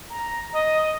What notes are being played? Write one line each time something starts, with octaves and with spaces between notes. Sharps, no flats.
A#5
D#5